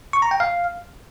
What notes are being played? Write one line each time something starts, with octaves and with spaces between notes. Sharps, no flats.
C#6
A#5
G5
F5